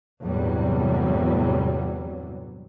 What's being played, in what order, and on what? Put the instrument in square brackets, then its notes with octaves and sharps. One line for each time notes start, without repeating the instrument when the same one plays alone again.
[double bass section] G1 E2 A2 C3 F#3 G3